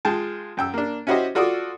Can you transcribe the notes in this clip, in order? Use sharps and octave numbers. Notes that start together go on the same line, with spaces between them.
G#3 F4 G5 A5
F#2 G5 E6
A#3 D4
C#4 E4 F#4 G4 C5 D#5
F4 F#4 A4 D5 D6 D#6